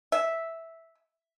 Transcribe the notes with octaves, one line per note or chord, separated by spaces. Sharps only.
E5